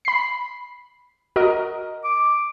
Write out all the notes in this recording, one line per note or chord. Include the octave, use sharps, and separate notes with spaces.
B5 C7
F#4 A#4 D#5
D6